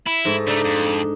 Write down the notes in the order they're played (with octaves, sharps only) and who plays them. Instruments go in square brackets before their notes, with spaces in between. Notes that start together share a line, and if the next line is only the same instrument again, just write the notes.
[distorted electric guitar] E4
[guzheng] G#2 A3 E5
[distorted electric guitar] C#3 A3 [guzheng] D4 D#4
[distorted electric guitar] F2